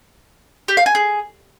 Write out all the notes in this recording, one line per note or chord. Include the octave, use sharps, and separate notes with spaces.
G4
F5
G#5
G#4